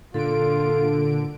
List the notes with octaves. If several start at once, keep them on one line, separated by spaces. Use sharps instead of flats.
A#2 D3 F4 A4 D7